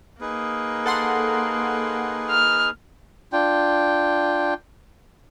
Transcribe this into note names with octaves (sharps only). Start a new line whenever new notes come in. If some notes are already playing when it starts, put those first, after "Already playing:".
A#3 D#4 G#4 B4
A4 F#5 C6
F6
D4 F4 G5